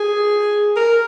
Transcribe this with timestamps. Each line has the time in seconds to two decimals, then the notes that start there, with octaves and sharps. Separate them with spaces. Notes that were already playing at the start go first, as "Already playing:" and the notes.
Already playing: G#4
0.76 A#4